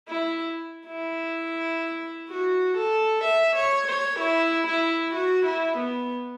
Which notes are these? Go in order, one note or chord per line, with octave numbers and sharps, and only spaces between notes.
E4
E4
F#4
A4
E5
C#5
C#5
E4
E4
F#4
E4
B3